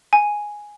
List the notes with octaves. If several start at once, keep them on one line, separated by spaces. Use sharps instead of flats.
G#5